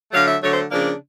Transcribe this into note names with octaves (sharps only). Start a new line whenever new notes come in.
D3 F#3 A3 F5
E5
D3 F#3 A3 C#5
C5
C#3 F3 A#3 D4